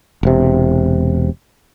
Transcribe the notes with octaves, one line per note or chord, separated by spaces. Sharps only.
E1 C3